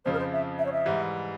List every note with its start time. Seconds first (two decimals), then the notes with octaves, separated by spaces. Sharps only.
0.05 F2 C#3 F3 C5
0.13 A#4
0.19 C5
0.32 E5
0.59 E5
0.66 C#5
0.73 E5
0.86 G#2 E3 G3